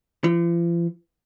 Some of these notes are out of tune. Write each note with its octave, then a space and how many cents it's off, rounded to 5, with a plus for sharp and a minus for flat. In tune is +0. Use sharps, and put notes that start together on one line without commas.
F3 -45